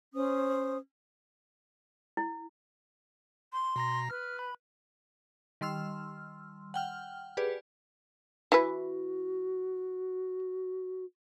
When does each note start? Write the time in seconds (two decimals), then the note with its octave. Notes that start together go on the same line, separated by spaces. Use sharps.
0.15 C#4 C5 D#6
2.17 E4
3.52 C6
3.76 B2 A#5 A#6
4.10 B4 F6
4.39 B5
5.61 D#3 G3 C6 E6 F6
6.74 F#5 G5 F6
7.37 G4 G#4 B4 D5
8.52 E3 E4 F#4 B4